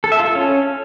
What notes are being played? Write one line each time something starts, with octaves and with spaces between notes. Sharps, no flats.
A4
E5
F4
A4
C#4